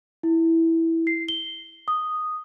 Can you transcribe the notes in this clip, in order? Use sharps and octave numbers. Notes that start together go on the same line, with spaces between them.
E4
C7
G7
D#6